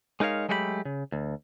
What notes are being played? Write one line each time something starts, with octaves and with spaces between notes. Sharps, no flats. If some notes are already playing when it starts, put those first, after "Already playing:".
G#3 D#4 A#4 C#5 F5
F#3 G#3 A3 G4 F5 B5
C#3
D2